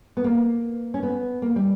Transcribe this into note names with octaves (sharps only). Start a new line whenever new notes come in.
B3
A#3
C#4
B3
A#3
G3